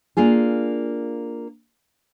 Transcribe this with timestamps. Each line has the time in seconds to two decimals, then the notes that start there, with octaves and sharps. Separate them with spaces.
0.17 A#3 D4 F4 G#4